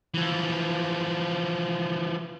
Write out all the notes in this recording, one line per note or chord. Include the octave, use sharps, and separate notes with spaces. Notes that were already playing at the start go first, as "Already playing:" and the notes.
E3 F3